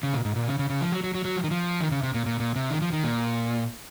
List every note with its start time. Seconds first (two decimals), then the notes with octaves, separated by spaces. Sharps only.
0.03 C#3
0.14 A#2
0.25 G#2
0.36 A#2
0.48 C#3
0.59 C#3
0.70 C#3
0.81 F3
0.92 F#3
1.04 F#3
1.15 F#3
1.25 F#3
1.37 F3
1.44 D#3
1.51 F3
1.81 D#3
1.91 C#3
2.03 C3
2.14 A#2
2.26 A#2
2.40 A#2
2.56 C3
2.70 D#3
2.82 F3
2.93 D#3
3.04 A#2